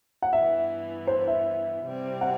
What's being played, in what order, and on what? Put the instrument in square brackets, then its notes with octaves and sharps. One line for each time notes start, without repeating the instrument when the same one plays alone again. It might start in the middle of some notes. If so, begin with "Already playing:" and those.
[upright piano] F#5
[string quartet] G2 E3 B3 [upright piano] E5
[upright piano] C5
E5
[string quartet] C3 G3 C4 E4
[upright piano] F#5